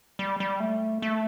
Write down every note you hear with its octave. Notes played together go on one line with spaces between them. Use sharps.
G3
G3
A3
A3